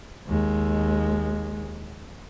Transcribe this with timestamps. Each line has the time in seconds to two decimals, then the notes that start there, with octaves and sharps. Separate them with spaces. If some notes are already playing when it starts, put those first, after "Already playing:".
0.27 D#2 G#3